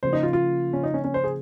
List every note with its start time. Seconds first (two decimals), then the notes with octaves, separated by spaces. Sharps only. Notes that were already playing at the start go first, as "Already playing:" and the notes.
0.03 C#3 F3 A#3 C5
0.13 D#4
0.23 F4
0.33 F4
0.73 C#4
0.83 D#4
0.94 C#4
1.04 C#4
1.14 C5
1.24 G#4